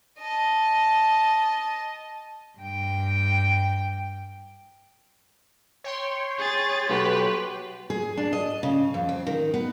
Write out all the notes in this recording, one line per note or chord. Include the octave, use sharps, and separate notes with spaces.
D#5 A5
G2 G5
C#5 G5 C6
G#4 A6
B1 G4 B4
G#4
D4
D#5
C#3
F2
C4
D#3
B3